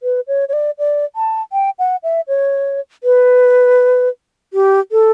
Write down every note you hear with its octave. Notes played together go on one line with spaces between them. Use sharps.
B4
C#5
C#5
D5
D5
A5
G5
F#5
E5
C#5
B4
G4
A4